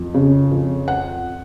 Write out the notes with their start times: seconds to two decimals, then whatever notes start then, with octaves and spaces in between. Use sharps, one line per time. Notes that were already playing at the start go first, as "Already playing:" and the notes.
Already playing: F2
0.14 C#3
0.51 F2
0.88 F#5